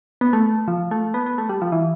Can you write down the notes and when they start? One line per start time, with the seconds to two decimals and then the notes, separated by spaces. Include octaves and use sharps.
0.21 B3
0.33 A3
0.68 F3
0.91 A3
1.14 B3
1.26 B3
1.38 A3
1.49 G3
1.62 F3
1.72 E3